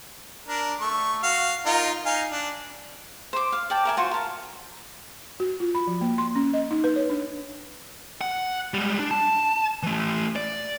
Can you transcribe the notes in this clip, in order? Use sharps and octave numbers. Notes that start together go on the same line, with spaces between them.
D4 A#4
A3 C#6
F#4 F5
D#4 F4 A#4
D#4 F5 G#5
D4
C5 D6
F5
D5 G5 A5
A#4 E5 G#5
F4 F#4 C5
A#4 A5
F#4
F4
B5
F3
A#3
C6
C#4
D#5
D#4
B4
C#5
D4
F#5
G3 G#3
D4
A5
E3 A3
D5